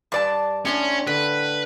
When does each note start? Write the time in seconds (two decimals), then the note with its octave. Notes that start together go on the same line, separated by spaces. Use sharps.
0.12 G2 D5 A5
0.65 A2 C#4 D4 C6 C#6
1.07 D3 B4